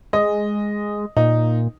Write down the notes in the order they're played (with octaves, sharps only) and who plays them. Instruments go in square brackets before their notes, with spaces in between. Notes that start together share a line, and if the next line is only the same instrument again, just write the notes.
[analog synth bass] G#3 [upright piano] D#5
[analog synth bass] A#2 [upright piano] D#4